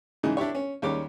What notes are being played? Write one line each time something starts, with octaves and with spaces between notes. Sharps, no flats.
G#2 C#3 E3 D#4
D4 E4 G4 C#5
C#4
D#2 G3 G#3 C#4 D6